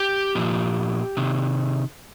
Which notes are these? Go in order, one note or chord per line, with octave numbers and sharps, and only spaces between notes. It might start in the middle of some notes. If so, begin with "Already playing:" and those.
Already playing: G4
A#2 F3
C3 D#3